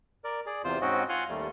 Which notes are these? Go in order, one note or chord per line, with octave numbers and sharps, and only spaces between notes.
A#4 D5
G#4 D5
E2 C3 F4 C5
G#2 C4 C#4 F#4 D#5
F4 F5 F#5 G#5 C6
D#2 G3 A3